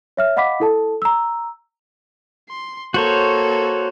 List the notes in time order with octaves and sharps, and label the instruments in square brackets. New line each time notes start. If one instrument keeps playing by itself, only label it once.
[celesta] C#5 E5 F6
D#5 F5 F#5 B5 D6 B6
E4 A4 A5
A#5 E6
[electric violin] C6
[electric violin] A#3 A4 [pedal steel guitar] F#4 C5 C#5